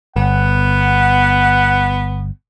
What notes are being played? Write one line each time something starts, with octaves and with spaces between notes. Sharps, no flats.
G1 B3 F#5